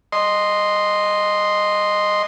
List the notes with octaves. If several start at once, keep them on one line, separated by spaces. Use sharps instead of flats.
D#5 C6